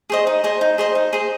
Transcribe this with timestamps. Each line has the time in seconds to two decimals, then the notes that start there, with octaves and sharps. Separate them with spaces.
0.10 G#4 C5 D#5
0.27 D#4
0.44 G#4 C5 D#5
0.61 D#4
0.78 G#4 C5 D#5
0.95 D#4
1.13 G#4 C5 D#5